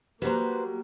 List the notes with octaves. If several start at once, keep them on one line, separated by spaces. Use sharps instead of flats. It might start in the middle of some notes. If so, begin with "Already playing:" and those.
F#3 G3 A#3 B4 C5 A#5